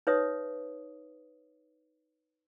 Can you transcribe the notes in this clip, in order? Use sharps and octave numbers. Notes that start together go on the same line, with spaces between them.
D#4 B4 C#5 E5 D#6